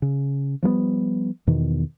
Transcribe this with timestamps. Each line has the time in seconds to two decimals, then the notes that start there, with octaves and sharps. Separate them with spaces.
0.02 C#3
0.63 F3 G3 A3 B3
1.47 E2 B2 D#3